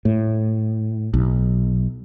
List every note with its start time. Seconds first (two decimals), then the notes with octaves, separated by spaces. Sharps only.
0.05 A2
1.14 B1